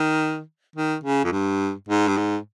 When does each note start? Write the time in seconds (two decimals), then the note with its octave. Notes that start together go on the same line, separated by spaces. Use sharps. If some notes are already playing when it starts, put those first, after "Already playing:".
Already playing: D#3
0.76 D#3
1.04 C#3
1.25 F2
1.32 G2
1.89 G#2
2.08 G2
2.17 G#2